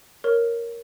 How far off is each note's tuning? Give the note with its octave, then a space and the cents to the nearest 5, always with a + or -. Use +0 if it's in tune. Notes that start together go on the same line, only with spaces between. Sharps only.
A#4 +0 C#5 +0